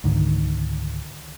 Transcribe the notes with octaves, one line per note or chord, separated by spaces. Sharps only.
C#2 G#2 D3 D#3